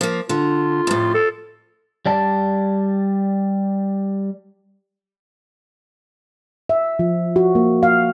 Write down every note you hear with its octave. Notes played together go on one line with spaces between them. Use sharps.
F3 A#3
D3 F4
F2 A2
A4
G3 D5 A5
E5
F3
F#4
A#3
F5